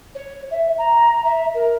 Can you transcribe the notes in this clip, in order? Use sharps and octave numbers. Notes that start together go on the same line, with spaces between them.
C#5
E5
A#5
E5
A#4